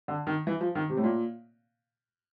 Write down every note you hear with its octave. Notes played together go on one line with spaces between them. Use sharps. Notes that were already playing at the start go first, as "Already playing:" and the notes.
D3
D#3
E3
F3
D#3
C3
A2
A#2